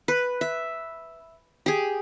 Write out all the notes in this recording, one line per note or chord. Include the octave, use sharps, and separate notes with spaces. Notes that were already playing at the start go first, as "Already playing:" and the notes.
B4
E5
G4 G#4